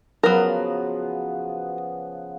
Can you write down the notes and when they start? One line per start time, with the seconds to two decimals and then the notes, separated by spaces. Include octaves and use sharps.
0.23 C#3 F3 F#3 B3 A#4